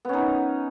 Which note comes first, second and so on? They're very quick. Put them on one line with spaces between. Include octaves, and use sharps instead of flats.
B3 C#4 D#4